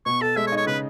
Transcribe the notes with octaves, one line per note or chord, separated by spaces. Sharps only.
B2 C#6
A4 A5
G#3 E5
C#5
D#4
C#5
C#3 B4